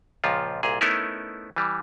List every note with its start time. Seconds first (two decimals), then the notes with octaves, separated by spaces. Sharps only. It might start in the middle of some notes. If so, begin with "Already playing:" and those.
0.24 C#2 A#2 F3 F4
0.63 C2 A#2 G#4
0.81 A3 B3 C#4 D#4 E4 A#4
1.56 E3 G3